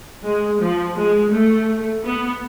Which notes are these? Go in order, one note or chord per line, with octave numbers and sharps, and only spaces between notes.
G#3
F3
G#3
A3
B3